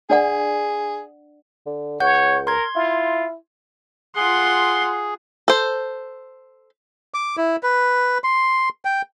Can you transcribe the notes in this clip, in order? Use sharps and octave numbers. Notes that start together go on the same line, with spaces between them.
D4 G#4 D5 F#5
D3
C#2 C#5 F#5 G6
A#4 C6 G#6
E4 F4
F4 G#4 F#5 C6
A4 C5
D6
E4
B4
C6
G5